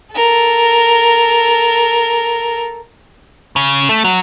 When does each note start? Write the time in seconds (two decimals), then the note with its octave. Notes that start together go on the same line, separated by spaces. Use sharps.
0.15 A4 A#4
3.56 C#3
3.89 A3
4.04 F#3